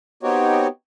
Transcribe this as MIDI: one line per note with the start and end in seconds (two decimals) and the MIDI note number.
0.23 0.67 59
0.23 0.67 60
0.23 0.67 63
0.23 0.67 66
0.23 0.67 67
0.23 0.67 73